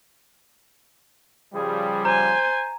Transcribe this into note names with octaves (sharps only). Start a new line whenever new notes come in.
C#3 F3 G3 G#4
C5 G#5 A#5